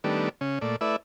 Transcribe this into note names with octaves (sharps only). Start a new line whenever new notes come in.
D#3 G3 A3 B3 D4
C#3 C#4
A#2 A3 D5
A3 E4 B4 D5 E5